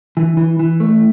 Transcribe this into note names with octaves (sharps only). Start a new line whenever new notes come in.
E3
E3
E3
A3